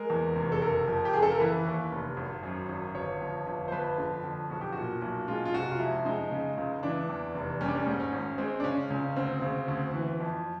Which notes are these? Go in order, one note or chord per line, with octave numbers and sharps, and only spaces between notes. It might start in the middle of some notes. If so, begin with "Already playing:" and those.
Already playing: G#3 A#4
E2
F1
A4
F#1 A#4
F2
G4
F#1 G#4
A4
A#4
E3 B4
D#2
F1
G#1
F#2
G#1
G1 C#5
F2
G1
C5
F2 B4
D3
F2
B1 F#4
G4
A#2 F#4
B1
G#3 F4
F4
C3 F#4
F4
F2 E4
G#3 D#4
C#3
C#2
E3 D4
E2
F1
G3 C#4
D4
C#4
G#2
C#4
G#1
G#3 C4
D4
C#3 C#4
C#2 C#4
D2 C4
C#3
D2
E3
F2